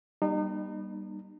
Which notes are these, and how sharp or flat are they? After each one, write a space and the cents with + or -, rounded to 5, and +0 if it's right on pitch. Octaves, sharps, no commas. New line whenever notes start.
G3 +0 A#3 +45 D#4 -35